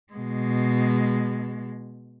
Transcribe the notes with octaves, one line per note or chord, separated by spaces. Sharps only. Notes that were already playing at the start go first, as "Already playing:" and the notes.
B2 G#3